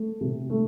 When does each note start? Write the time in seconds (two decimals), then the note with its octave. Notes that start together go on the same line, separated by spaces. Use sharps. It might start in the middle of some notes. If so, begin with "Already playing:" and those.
Already playing: A3
0.21 C3
0.50 A3